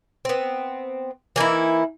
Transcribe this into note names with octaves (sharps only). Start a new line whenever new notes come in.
B3 C4
E3 A#3 D#4 E4